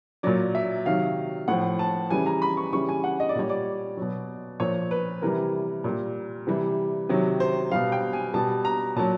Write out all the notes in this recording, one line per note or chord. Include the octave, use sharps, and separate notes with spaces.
A#2 F#3 D5
E5
C3 D#3 F#3 F5
A2 F3 F#5
A5
C#3 E3 G3 G#5
A#5
B5
C#6
C#3 E3 G3 C#6
G#5
F#5
D#5
D5
A#2 G3 C#5
D5
B2 F#3
A#2 F3 C#5
B4
C3 E3 G3 A#4
A#2 G3
C3 E3 G3
C3 D#3 F#3
C5
B2 G3 F5
G5
G#5
B2 G3 A5
A#5
A#2 F#3 A5